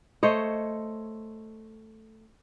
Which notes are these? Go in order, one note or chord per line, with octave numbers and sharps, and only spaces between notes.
A3 C5 C#5 D#5